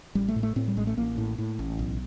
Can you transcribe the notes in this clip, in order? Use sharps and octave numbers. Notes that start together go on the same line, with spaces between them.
A1 G3
A3
A2
A3
A2 C4
G3
A1 G#3
A3
A1 A#3
A2
A2
A1
B1